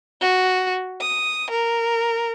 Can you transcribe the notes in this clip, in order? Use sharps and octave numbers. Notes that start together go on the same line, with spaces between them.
F#4
D#6
A#4